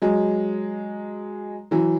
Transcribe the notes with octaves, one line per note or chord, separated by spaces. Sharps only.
F#3 G#3
E3 F#3